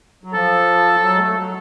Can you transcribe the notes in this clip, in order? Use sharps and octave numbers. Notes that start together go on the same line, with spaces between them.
F#3
F3 A4
F#3
G#3
A3
F#3